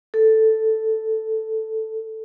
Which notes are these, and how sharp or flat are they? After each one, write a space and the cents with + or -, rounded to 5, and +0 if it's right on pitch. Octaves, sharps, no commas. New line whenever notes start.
A4 +0